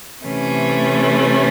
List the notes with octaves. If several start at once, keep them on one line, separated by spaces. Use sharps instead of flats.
C3 E3 A3 C#4